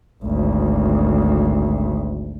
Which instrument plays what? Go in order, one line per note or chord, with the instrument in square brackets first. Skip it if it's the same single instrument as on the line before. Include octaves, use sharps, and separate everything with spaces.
[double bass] G#1 D2